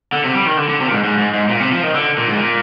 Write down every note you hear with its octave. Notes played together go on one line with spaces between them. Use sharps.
D3
C3
G3
D#3
D3
D3
C3
A#2
G#2
G#2
G#2
G#2
A#2
C3
F3
D#3
D3
A#2
G#2
A#2